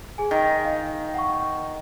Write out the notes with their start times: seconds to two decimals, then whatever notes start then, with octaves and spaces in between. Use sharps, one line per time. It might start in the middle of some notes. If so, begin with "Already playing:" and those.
0.18 G#4 G#5
0.31 D#3
0.65 D#5 F5
1.14 F#5 C#6